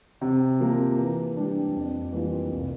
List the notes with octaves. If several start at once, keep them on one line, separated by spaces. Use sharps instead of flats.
C3
F3 A#3
E3
G3 D4
F2
E3 G3 A#3 F4
C2